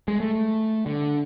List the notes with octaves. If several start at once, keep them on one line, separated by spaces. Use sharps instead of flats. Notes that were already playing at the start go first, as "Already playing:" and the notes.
G#3
A3
D3